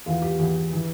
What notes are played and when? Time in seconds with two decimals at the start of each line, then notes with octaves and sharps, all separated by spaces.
0.06 E2 E3 F4
0.22 G4
0.39 E2 E3 G4
0.73 E3